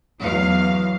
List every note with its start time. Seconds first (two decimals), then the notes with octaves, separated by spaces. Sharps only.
0.20 E2 F#3 F5